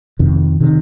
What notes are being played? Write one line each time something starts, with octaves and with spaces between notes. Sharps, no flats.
F2 C3 D#3
C3 D#3